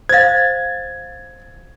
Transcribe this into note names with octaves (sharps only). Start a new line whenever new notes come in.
C5 F5 G#6 A6